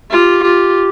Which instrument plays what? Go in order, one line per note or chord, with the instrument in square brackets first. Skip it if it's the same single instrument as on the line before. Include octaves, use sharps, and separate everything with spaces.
[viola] F4 [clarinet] G4
[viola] F4 [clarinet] G4